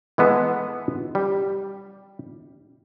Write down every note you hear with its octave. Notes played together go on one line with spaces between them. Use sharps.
E3 G#3 B3 A4
G3